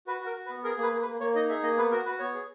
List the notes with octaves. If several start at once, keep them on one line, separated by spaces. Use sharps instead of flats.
F#4 B4
F#4
A#4
F#4
B4
B3
G#4 A#4
A#3
B4
A#3
B4
A#3
A#3 C#5
D#4 D#5
G#4 E5
A#3 D#5
B3 B4
F#4 A#4
F#4 B4
B3 C#5
G#4